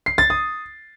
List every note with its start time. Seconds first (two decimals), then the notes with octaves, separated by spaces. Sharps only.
0.06 C7
0.18 A6
0.30 D#6